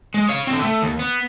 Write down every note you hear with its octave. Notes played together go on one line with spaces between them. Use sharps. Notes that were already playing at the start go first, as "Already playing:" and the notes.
G#3
C#5 F5
D3 C4
A3
D#2
B3